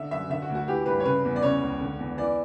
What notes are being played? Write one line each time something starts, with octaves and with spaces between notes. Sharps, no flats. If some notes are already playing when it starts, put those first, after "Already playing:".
Already playing: D3 E5
F#2 E5
D3 E5
F#4
D2
F#4
E3 G4
G2 B4
C#5
C#3 B4
E2
D5
C#3 C#5
C#2
D3
E2
E3 D5